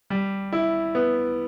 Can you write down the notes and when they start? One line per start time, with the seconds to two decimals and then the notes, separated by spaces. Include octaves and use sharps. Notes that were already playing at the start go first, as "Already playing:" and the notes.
0.10 G3
0.52 E4
0.95 B3